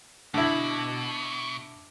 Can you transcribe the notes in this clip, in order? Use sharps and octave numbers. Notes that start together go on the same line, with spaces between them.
B2 D3 E4